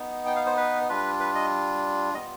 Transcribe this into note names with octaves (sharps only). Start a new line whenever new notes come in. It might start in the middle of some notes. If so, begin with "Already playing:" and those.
Already playing: B3 D#4
G5
F5
C5
B4
G3 D4 F4 B4
B4
D#5
G3 B3 F4 D#5